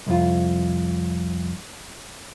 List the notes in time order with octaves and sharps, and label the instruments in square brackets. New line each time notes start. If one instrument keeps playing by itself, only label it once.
[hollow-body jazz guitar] C2 F2 F4